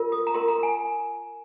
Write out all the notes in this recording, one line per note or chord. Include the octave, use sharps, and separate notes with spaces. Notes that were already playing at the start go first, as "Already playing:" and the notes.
Already playing: F4 A#4
D#6
A#5
F4 A#4 C6
A#5
G#5